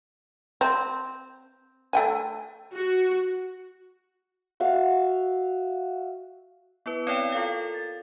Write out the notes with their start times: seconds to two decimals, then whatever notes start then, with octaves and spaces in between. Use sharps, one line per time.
0.61 C4
1.93 A3 G5 G#5
2.74 F#4
4.60 F#4 E5 F5
6.86 B3 E4 B4
7.07 C4 E4 C#5 D5 F5 G5
7.32 F4 A4 A#4 F5
7.74 A6